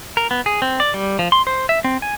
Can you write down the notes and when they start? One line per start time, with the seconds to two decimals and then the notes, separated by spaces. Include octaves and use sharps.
0.17 A#4
0.31 B3
0.46 G#4
0.62 C4
0.80 D5
0.94 G3
1.19 F3
1.32 C6
1.47 C5
1.69 E5
1.84 C4
2.02 G#5